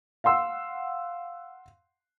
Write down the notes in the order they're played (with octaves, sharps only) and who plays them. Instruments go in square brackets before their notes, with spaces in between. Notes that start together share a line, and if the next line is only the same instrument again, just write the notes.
[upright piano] F5 F#5 C6 E6